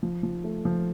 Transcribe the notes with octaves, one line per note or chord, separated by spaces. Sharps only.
F3
F3
A3
F3